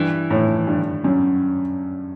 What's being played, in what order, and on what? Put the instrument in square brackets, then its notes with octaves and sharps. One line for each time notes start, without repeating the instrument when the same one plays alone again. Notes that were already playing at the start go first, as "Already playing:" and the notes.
Already playing: [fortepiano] G2 [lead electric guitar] E3
[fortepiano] A2
G2
F#2